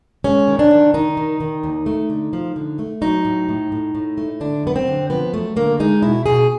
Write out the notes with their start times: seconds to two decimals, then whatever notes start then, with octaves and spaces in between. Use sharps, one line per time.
0.24 G#3 C#4
0.48 D#3
0.59 D4
0.71 D#3
0.94 D#3 D#4
1.17 D#3
1.40 D#3
1.63 D#2
1.86 A3
2.10 D3
2.33 F3
2.56 D3
2.79 A3
3.01 F#3 D#4
3.25 A2
3.49 A2
3.72 A2
3.95 A2
4.18 A3
4.40 D3 D4
4.63 F#2 B3
4.76 C4
4.88 D3
5.10 F3 B3
5.34 F#2 A3
5.56 D3 A#3
5.80 G#3 D#4
6.02 B2 E4
6.26 B2 G#4